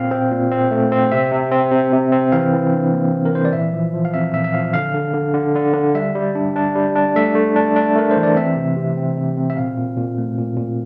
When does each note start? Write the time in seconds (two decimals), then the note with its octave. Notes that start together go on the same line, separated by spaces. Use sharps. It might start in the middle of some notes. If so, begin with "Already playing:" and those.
Already playing: A#2 C4 F5
0.11 C4
0.31 A#2
0.51 C4
0.71 A3
0.92 C4
1.12 C3 E5
1.32 C3
1.52 C4
1.72 C3
1.93 C3
2.12 C4
2.32 E3 F5
2.53 E3
2.72 D4
2.92 A#3
3.13 E3
3.25 A#4
3.34 E3 C5
3.45 D5
3.53 A#2 E5
3.73 F3
3.94 F3
4.05 F5
4.14 C4 E5
4.33 A#2 E5
4.44 E5
4.54 F3 F5
4.73 D3 F5
4.94 D3
5.14 D3
5.34 D3
5.55 D3
5.74 D3
5.95 G3 E5
6.15 G3
6.35 D4
6.56 D4
6.75 G3
6.96 D4
7.15 A3 E5
7.35 A3
7.56 D4
7.76 D4
7.96 A3 A#4
8.11 C5
8.17 E3
8.23 D5
8.36 C4 E5
8.56 C3
8.76 C3
8.97 C4
9.17 C3
9.37 C4
9.50 E5
9.57 A#2 F5
9.77 A#2
9.97 A#2
10.18 A3
10.38 A#2
10.57 A#2